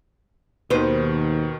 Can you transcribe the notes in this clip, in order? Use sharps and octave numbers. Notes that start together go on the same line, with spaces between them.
D#2 B2 D#3 B4 C5